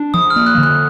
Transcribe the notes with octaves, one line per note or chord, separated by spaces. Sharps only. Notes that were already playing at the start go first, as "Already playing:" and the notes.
Already playing: D4
F3 D#6
F6
A#3
F#6
D3
F#6